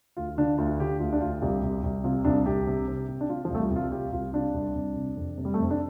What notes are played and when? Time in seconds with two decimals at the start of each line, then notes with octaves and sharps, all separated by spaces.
0.17 D2 F4
0.38 D3 D4
0.58 D2 F4
0.80 D3 G4
1.00 D2 F4
1.13 D4
1.21 D2 F4
1.42 C2 G4
1.63 C2
1.83 C2
2.04 C3 F4
2.25 C2 D4
2.46 C2 G4
2.67 C3
2.88 C3
3.08 C3
3.21 D4
3.29 C3 F4
3.45 F3
3.50 C2 A3
3.61 G3
3.71 C2 F4
3.92 C3 G4
4.12 C2 F4
4.33 C3 D4
4.54 C2
4.75 C2
4.96 C3
5.16 F2
5.38 C3
5.45 G3
5.54 A3
5.59 F2 C4
5.71 D4